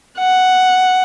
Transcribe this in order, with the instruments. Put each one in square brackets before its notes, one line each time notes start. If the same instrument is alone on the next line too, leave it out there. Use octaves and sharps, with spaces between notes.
[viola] F#5